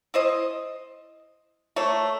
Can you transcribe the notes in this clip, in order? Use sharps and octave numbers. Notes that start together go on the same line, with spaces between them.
E4 C5 D#5
A3 A#3 C#5